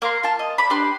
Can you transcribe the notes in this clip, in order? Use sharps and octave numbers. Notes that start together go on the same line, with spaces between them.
A#3 A#5 C6
F4 A5
D#5
D5 B5
D4 G4 B4 C6